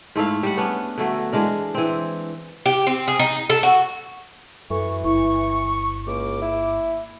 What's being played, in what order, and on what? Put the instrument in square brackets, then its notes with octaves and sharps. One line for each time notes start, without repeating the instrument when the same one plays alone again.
[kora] G#2 A3 E4 F5
G3 F#5
B3 C#4 D4
D3 F#3 A3
E3 G#3 D4 A#4
E3 C4
[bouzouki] G4
C4
G#4
D#4
A4
F#4
[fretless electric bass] F#2 [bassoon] E3 [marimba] A4 [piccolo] C#6
[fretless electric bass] G1 [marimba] E4 [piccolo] C#6
[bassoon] C#2 [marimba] A#3 [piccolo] D6
[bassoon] E4